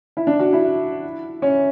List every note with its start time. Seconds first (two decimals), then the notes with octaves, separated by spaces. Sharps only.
0.17 E4
0.27 D4
0.39 F#4
0.53 E4
1.42 C#4